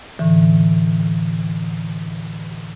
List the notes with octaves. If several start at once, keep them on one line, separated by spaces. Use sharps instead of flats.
A2 D3 E3